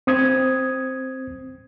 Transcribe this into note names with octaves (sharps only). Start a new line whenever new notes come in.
C4 D#6 G#6